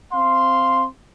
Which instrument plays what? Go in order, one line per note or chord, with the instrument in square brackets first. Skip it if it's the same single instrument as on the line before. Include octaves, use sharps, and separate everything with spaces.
[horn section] C4 F5 C6